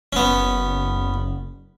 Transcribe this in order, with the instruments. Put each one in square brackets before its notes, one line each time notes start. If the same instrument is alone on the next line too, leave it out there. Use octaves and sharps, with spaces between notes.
[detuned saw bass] F#1 [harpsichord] B3 C#4